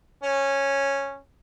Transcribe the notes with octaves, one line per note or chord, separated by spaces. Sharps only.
C#4